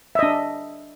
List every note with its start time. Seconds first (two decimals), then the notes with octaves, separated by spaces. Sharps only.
0.15 E5
0.19 D#5
0.23 D4